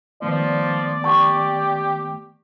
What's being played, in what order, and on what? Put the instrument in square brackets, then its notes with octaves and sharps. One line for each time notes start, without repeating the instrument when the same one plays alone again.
[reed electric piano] D#3 A3 B3 [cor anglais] F3 [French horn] D5
[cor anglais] G4 [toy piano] A5 C#6